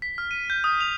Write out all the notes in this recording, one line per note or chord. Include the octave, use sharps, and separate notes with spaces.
B6
F6
D#7
G6
D#6
F7